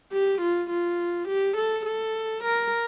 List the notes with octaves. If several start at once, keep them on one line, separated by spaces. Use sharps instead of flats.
G4
F4
F4
G4
A4
A4
A#4